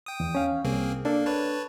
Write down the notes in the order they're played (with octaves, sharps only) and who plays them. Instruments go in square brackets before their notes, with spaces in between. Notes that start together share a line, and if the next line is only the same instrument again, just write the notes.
[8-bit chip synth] G5 D#6
[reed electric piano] E2
C#4 F5
[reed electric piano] C2 [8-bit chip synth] A#3 C4 G#4
[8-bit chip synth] A#3 [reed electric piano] D4 A4
[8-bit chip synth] B4 C#5 A5